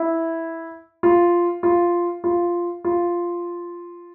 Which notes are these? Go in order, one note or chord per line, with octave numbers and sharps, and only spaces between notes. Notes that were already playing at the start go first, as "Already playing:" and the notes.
Already playing: E4
F4
F4
F4
F4